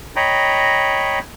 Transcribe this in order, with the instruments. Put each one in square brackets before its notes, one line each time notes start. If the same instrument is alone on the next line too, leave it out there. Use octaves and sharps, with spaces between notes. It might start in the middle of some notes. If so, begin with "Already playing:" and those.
[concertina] C#5 D#5 G5 A#5 B5